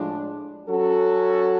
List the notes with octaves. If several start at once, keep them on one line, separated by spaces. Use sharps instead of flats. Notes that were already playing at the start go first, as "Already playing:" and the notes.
Already playing: A2 F3 G#3 D4
F#3 C#4 F#4 A4